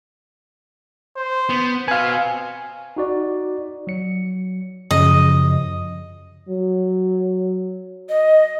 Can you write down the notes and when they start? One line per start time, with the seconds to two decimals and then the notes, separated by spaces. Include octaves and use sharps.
1.16 C5
1.49 B3
1.88 C4 F#4 B4 F5 G#5
2.96 D#4 F#4 D5
3.87 F#3 C#7
4.91 F#2 C#3 F3 D#5
6.49 F#3
8.09 D#5